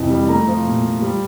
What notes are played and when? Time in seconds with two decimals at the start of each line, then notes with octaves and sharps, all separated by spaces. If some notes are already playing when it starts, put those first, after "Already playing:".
Already playing: F2 C3 E3 E4
0.10 G3
0.28 A3 A#5
0.48 F3
0.66 A#2
0.84 A#2
1.02 G3